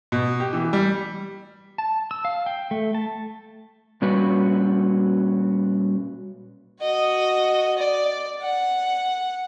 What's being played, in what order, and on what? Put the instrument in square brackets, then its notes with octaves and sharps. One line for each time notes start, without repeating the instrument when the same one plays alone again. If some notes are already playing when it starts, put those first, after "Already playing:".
[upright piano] B2
G4
E3
G3
[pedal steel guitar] A5
E6
F5
G5
A3
A5
[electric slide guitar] A#2 G3 C#4 F#4 B4
[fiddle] F#4 D#5
D5
F#5